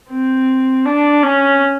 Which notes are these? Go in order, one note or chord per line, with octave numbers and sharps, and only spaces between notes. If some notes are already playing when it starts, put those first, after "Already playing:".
C4
D4
C#4